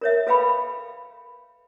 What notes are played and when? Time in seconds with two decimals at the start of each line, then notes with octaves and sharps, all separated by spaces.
0.01 A#4 C#5 E5
0.27 A4 B4 F5 G5 B5